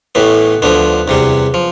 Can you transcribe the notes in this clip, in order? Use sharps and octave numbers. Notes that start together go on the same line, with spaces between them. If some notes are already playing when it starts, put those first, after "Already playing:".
A1 A2 E3 B3
D2 D3 F3 B3
E2 C3 G3
F3